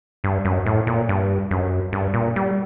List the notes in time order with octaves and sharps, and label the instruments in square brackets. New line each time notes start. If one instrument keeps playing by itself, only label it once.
[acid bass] G2
F#2
A2
A#2
G2
F#2
G2
A#2
G3